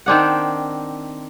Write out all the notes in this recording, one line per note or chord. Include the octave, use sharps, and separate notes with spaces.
D#3 C4 D4 F#5